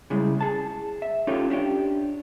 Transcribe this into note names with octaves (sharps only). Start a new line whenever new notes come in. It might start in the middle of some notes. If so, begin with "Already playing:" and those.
C#3 G3 G#3 E4
G#4 A5
E5
C#4 D#4 F4 G4 A4
D4 G4 C#5 G5